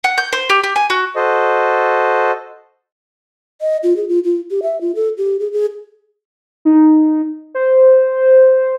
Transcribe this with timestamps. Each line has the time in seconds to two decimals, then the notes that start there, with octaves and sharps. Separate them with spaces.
0.04 F#5
0.18 G6
0.33 C5
0.50 G4
0.64 G4
0.76 G#5
0.90 F#4
1.15 F#4 A4 C5 D#5
3.61 D#5
3.83 F4
3.97 G#4
4.09 F4
4.24 F4
4.51 G4
4.63 E5
4.81 F4
4.95 A4
5.18 G4
5.40 G#4
5.52 G#4
6.65 D#4
7.55 C5